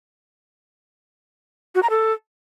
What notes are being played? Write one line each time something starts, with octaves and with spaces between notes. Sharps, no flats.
F#4
A#5
A4